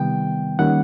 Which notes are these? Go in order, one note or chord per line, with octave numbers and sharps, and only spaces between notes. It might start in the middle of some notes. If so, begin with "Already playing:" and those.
Already playing: C3 D#3 G3 B3 G5
D#3 G3 A#3 C#4 F#5